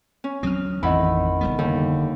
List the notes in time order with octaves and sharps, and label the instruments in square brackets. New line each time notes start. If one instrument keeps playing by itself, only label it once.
[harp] C#4
[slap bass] D2 F#3 C4 [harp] D#6 F6
[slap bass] A1 E3 [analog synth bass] F2 [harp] D#3 E4 [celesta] D#5 F#5 B5
[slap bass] F1 G3 B3
[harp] D#2 [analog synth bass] D3